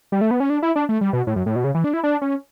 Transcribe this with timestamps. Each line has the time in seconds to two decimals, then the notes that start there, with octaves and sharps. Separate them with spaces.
0.12 G3
0.21 A3
0.31 B3
0.40 C#4
0.50 D4
0.62 E4
0.76 D4
0.89 A3
1.01 G3
1.13 B2
1.27 A2
1.36 F#2
1.46 A2
1.56 B2
1.64 C#3
1.75 E3
1.84 D4
1.94 E4
2.04 D4
2.22 C#4